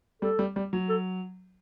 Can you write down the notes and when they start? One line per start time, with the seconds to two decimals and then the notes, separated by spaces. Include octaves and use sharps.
0.22 G3 A4
0.39 G3
0.56 G3
0.73 F#3
0.89 A4